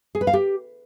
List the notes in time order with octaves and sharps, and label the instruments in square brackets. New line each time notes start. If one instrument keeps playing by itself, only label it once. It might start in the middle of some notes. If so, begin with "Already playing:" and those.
[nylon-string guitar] G#4
B4
F5
G4